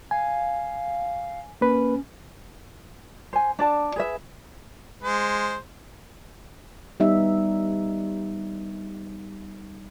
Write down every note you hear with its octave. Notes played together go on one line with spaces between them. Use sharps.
F5 G#5
A#3 C#4 B4
C5 G#5
D4 D5 A5
G#4 B4 E5
G#3 C5
G3 B3 D#4 E5